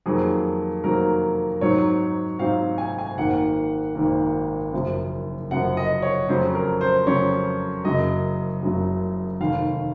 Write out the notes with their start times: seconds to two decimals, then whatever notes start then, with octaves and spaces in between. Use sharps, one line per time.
0.06 F2 D#3 F#3 A#3 G#4
0.84 F2 D#3 F#3 A#3 A#4
1.61 G#2 F#3 C4 D#4 C#5
2.39 G#2 F#3 C4 D#4 F5
2.78 G#5
2.98 G#5
3.17 G#1 G#2 D#3 A#3 F#5
3.95 G#1 G#2 D#3 A#3
4.73 F#1 F#2 F3
5.51 F#1 F#2 F3 F#5
5.77 D#5
6.02 C#5
6.29 F2 C#3 F#3 C#4 C5
6.55 A#4
6.81 C5
7.06 F2 C#3 F#3 C#4 C#5
7.84 F#1 F#2 C#3 F#3 D#5
8.62 F#1 F#2 C#3 F#3
9.40 F1 D#2 D#3 F5